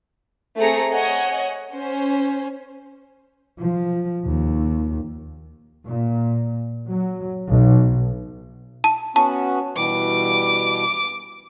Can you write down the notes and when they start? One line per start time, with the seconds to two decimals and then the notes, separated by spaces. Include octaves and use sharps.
0.58 A3 C4 G#4 A#5 C#7
0.92 C#5 D#5 F#5 G#5
1.74 C#4 C5
3.59 F3
4.25 D#2
5.87 A#2
6.88 F#3
7.49 B1
8.84 A5
9.16 B3 C#4 F#4 A5
9.76 B2 E3 G3 D6